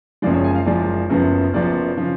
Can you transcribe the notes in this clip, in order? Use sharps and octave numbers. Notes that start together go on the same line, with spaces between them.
F#1 F#2 F3 G#3 D5
C#5
G#5
F5
F#1 F#2 F3 G#3 D5
F#1 F#2 F3 B3
F#1 F#2 F3 B3 D5
C#3 F3